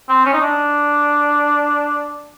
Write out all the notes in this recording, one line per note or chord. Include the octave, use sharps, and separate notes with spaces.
C4
C#4
D#4
D4